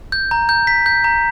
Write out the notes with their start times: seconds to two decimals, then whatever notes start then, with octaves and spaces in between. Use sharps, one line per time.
0.12 G6
0.31 A#5
0.49 G6
0.67 B6
0.86 G6
1.04 A#5